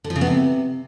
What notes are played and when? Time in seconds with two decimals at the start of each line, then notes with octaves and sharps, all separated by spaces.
0.04 D3
0.10 F3
0.16 C#3
0.21 B3
0.27 C3